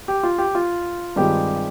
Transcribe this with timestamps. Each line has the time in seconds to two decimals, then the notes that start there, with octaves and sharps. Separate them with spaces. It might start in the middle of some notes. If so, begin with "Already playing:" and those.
0.08 G4
0.23 F4
0.38 G4
0.55 F4
1.16 G2 D#3 G#3 C4 F4 G4